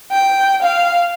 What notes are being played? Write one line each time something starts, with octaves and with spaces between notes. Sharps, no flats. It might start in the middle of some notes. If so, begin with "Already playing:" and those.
G5
F5